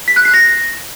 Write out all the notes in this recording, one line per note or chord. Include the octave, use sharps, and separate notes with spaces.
B6
F#6
C7
A#6